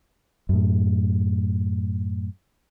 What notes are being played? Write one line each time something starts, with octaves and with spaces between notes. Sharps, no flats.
F#2 A2